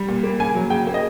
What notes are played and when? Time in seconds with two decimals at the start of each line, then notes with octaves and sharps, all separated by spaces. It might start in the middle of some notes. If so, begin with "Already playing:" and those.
Already playing: G3
0.09 A#2
0.23 A#3
0.40 C#3 G#5
0.55 F#3
0.70 C#3 G5
0.87 A#3
0.94 D#5